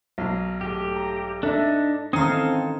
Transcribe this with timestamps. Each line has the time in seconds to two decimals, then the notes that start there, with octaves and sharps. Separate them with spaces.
0.18 B1 A#5 F6 C7
0.61 G#2 A3 G4
0.96 A#5
1.43 D4 D#4 A4 E5
2.13 D#3 E3 C4 C#4 A4 F5 A#5 D#6